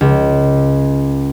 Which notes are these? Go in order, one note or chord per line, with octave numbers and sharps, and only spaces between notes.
C#2